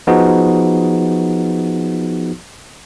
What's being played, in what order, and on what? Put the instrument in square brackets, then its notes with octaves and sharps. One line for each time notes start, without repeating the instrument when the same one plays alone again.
[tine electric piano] F3 B3 D#4 F#4 G#4